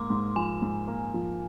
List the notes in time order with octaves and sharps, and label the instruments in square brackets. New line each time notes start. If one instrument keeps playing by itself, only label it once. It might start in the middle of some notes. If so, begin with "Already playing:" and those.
Already playing: [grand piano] G#2 A#3 [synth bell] C6 D6
[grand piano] G#2
[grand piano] F3 [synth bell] G#5
[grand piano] G#2
A#3
F3